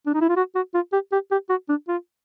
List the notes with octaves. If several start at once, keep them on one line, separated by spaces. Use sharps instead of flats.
D4
D#4
E4
F4
F#4
F#4
F4
G4
G4
G4
F#4
D4
F4